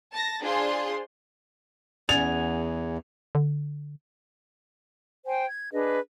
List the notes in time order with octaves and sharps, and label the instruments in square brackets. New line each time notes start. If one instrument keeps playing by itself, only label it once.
[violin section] A5 A#6
D4 F4 G#4 C5 C6
[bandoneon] E2 [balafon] C#4 D5 [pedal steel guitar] G#4 F#5 G#5 [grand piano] F7
[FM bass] D3
[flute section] C5 G5 G#5
G#6
D4 G#4 B4 D#5